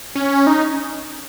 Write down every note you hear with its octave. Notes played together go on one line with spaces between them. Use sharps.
C#4
D#4